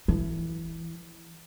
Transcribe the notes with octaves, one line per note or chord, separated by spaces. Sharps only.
E3